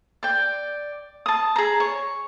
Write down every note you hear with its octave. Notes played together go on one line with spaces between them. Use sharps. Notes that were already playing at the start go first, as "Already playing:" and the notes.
D5 G5
A5 D#6
G#4 A#5
C#5